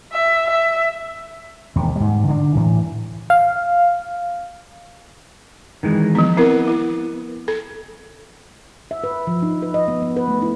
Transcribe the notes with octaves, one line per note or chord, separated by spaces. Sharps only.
E5
E5
E1 D#2 C3
G#2 G3
D3 D4
A2 E3
F5
D#3 E3 G#3
F3 B3
B3 C4 E4 A#4
E4
A4
E5
B4
F3
D#4
B4
D#5
B3
B3
B4
A3
E4